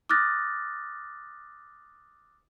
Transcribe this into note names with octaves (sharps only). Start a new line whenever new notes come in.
D6 D#6 F6 F#6 A6 A#6